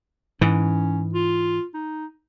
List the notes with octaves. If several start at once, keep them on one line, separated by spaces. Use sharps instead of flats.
G#2 E3 C#4
F4
D#4